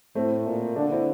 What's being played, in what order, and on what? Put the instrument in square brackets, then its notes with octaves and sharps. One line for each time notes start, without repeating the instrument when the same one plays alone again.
[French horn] A2 [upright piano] A3 C4
[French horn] A#2
[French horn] D3 [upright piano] A#3 D4
[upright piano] C4 E4